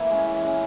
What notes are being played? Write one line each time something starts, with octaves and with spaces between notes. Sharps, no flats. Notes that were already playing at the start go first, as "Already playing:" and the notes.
Already playing: E3 A#3 E4
G#3 C#4
E3
G#3 C#4